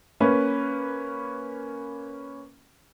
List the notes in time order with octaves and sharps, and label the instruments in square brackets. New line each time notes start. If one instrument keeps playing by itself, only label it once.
[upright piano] A#3 C#4 B4